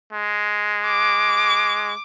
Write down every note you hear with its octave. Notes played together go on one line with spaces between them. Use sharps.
G#3
D6